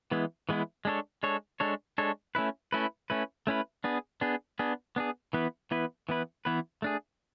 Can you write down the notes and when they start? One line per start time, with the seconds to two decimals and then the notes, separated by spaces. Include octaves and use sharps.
0.11 E3 G#3 B3 E4
0.49 E3 G#3 B3 E4
0.85 G#3 D4 A4 C#5
1.23 G#3 D4 A4 C#5
1.60 G#3 D4 A4 C#5
1.98 G#3 D4 A4 C#5
2.35 A3 C#4 E4 B4
2.72 A3 C#4 E4 B4
3.10 A3 C#4 E4 B4
3.47 A3 C#4 E4 B4
3.84 B3 D4 G#4
4.21 B3 D4 G#4
4.59 B3 D4 G#4
4.96 B3 D4 G#4
5.33 E3 B3 E4 B4
5.71 E3 B3 E4 B4
6.09 E3 B3 E4 B4
6.45 E3 B3 E4 B4
6.82 A3 D4 G#4